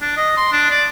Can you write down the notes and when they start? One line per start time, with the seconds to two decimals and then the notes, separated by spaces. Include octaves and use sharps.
0.01 D4
0.17 D#5
0.37 C6
0.52 D4
0.70 D5